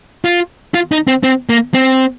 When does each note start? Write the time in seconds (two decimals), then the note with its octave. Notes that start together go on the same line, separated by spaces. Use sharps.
0.25 F4
0.74 F4
0.92 D#4
1.08 C4
1.23 C4
1.49 A#3
1.74 C4